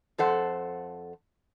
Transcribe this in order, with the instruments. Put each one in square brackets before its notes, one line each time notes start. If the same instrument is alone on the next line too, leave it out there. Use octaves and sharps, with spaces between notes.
[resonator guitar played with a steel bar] F2 A4 C5 F#5